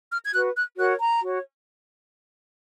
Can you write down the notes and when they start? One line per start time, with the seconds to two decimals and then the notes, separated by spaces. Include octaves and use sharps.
0.11 F6
0.24 G#6
0.33 F#4 B4 F#6
0.56 F#6
0.77 F#4 A#4 C#5 F#6
1.00 A#5
1.22 F#4 C#5